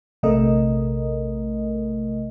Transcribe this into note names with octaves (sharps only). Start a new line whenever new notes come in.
A#1 C3 A3 A#4 D#5